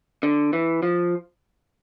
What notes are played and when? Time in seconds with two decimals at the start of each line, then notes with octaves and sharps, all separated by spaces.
0.23 D3
0.53 E3
0.83 F3